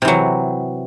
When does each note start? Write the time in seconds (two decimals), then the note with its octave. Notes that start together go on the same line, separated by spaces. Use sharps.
0.02 C3
0.05 E3
0.08 F#3